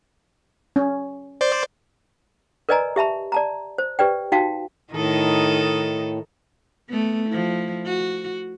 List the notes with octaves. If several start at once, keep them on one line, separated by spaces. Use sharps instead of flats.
C#4
C5 D5
A#4 B4 D5 D#5 G#5 A#5
G4 E5 A5 B5
D5 A5 A#5
C5
G4 B4 D5 G5
D#4 F#4 F5 G5 A5
A2 D#3 D#4 A4
A3 B3
F3 E4
F#4